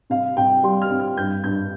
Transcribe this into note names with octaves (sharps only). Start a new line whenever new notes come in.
C3 F5
C3 G5
G3 C6
F6
C4
F6
G2 G6
G2 G6